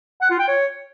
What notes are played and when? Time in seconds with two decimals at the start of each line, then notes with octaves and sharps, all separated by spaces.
0.22 F#5
0.30 F4
0.39 G5
0.48 C#5